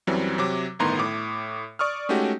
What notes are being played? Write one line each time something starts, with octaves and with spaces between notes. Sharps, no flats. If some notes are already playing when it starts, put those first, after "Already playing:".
F#2 E3 F#3 G3 C4
C3 F#3 D6
G1 A2 D#3 B3 A#5 C6
A2 D6
D5 C#6 D#6 F6
G#3 A3 C#4 D#4 F#4 G4